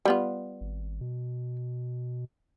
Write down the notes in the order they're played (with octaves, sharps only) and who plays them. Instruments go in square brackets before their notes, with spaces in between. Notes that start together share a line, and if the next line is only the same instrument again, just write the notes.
[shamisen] G3 B3 F4
[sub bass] G#1
B2